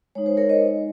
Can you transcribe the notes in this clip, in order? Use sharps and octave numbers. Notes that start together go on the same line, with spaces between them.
G#3 D#4 C#5
C5
A#4 C#5
C5 D#5